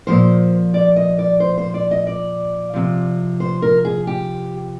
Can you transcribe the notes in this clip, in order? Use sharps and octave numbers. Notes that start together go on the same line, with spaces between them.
A#2 F3 C5
D5
D#5
D5
C5
C5
D5
D#5
D5
C3 F3
C5
A#4
G#4
G4